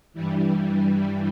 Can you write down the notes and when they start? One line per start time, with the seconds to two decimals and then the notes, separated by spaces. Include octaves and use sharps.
0.14 G2 E3 G3
0.88 G3